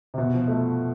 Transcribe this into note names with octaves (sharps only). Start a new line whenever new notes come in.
C3
B2
F3
A3